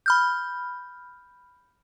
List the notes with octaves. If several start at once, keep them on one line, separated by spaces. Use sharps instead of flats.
B5 F6 G6